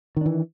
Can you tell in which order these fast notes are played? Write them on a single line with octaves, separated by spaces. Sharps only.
D#3 D4 E3